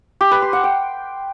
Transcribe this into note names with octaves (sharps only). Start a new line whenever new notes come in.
G4
B4
C6
F#5
G5